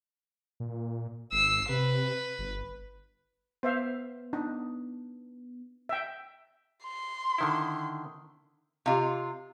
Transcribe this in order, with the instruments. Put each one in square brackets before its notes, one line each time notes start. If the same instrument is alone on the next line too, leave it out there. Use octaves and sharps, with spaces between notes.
[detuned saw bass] A#2
[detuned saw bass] G#1 [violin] E6 C7
[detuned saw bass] C3 [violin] B4
[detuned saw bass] G1
[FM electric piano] B3 [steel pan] C5 E5 F5
[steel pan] D4 D#4
E5 G5
[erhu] C6
[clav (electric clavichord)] D3 D#3 E4
[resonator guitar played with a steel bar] C3 F4 [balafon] G4 D#5 F5